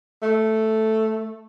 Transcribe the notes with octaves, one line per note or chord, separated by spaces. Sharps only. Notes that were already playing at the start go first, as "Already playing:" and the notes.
A3